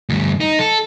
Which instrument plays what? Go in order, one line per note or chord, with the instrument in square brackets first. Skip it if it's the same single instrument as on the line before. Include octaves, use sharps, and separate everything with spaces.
[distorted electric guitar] D2 G2
D#4
A4